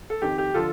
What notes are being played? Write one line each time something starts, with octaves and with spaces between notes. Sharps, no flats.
A4
F2 D#3 G4
G4
D3 F3 F4 A4